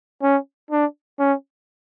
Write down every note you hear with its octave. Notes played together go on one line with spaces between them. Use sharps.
C#4
D4
C#4